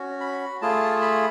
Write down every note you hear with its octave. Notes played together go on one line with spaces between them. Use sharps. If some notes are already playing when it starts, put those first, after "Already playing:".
Already playing: C#4 F#4
B5
A3 F4 G#4 A5
B5